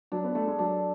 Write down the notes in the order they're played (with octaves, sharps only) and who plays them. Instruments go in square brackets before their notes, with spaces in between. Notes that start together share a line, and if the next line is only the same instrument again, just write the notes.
[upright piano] F#3 [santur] D4
[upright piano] B3
[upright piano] A3 [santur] A4
[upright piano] G#3
[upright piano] F#3 [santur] D4